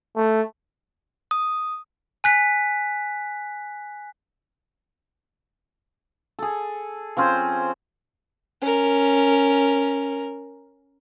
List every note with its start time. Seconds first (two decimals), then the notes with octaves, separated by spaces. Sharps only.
0.16 A3
1.31 D#6
2.24 G#5 F#6 B6
6.39 G#4 A4
7.17 F3 C4 C#4 C5
8.62 C#4 A#4